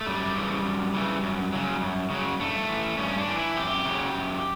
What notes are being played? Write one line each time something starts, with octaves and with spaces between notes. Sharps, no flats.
A3
F#2 G3
C#3 E3
F#2
C#3 E3
F#2
C#3 F#3
F#2
C#3 F#3
G2 A3
E3
G2 C#4
D4
E3
E4
F#2 G4
C#3 F#3
F#2